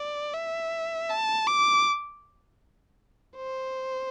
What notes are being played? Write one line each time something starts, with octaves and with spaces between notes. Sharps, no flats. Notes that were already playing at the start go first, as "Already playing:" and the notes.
Already playing: D5
E5
A5
D6
C5